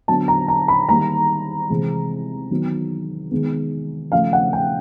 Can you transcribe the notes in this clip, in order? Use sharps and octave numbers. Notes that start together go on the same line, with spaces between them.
D3 F#3 B3 A5
A#5
A#5
B5
D#3 G3 A#3 A#5
C3 E3 G#3 C4
D#3 F#3 B3
D#3 G#3 B3
C#3 F3 A3 F5
F#5
G5